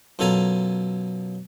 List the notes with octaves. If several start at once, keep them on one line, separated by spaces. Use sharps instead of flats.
F#2 B2 F4 A4 G#5 A#5